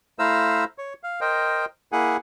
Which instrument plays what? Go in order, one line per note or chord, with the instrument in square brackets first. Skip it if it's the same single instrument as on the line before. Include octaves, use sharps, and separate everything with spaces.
[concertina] A3 E4 C5 F5 A#5 E6
C#5
F5
A#4 C5 D#5 G5
A#3 E4 G#4 F#5 G#5